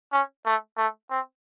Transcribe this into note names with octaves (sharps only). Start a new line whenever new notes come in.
C#4
A3
A3
C4